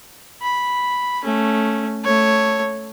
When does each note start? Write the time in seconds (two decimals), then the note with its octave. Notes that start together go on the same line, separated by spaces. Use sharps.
0.42 B5
1.23 A3 C#4
2.04 A3 C#5